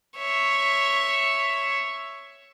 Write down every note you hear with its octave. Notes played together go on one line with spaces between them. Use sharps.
C#5 E5